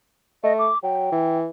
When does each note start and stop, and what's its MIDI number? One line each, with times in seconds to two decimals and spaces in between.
0.43 0.68 57
0.43 0.53 75
0.59 0.78 86
0.83 1.07 54
0.83 1.37 79
1.12 1.49 52